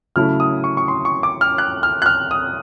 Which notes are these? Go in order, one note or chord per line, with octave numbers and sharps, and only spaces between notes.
C#3 F#3 A3 C#4 E4 F6
D#6
C#6
C#6
C6
C#6
D6
F6
F#6
F6
F#6
F6
D#6